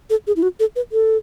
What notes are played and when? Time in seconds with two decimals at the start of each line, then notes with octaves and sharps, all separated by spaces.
0.10 A4
0.27 G#4
0.36 E4
0.43 F#4
0.60 A4
0.76 B4
0.92 A4